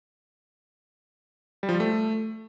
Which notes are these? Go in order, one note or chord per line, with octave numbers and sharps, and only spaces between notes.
G3
F3
G3
A3